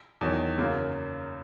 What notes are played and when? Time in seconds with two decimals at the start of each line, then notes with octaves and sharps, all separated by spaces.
0.21 E2 D#3 F#3
0.58 F#2 C#3 F#3 A#3